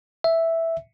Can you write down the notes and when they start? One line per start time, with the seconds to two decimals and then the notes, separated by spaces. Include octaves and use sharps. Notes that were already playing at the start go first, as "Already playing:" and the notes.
0.24 E5